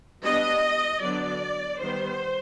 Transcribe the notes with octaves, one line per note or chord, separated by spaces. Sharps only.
G3 B3 D4 D#5
D3 F#3 B3 D4 D5
D#3 G3 B3 C5